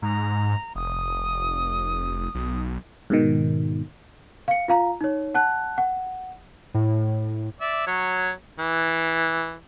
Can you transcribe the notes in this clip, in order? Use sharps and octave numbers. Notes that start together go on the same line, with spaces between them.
G#2 A#5
F1 D#6
B1
G#2 B2 D#3
F5 C#7
F4 F5 A#5
D#4 C#5
F#5 A5 F#6
F#5
A2
D5 E5
F#3 C#5
E3